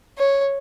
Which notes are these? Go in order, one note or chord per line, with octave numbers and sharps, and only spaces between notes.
C#5